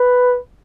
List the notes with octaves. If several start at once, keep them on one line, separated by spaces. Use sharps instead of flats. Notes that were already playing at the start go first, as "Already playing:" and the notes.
Already playing: B4